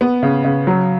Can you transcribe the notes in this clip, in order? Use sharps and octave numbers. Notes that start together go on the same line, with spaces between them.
B3
C#3
C#3
F#3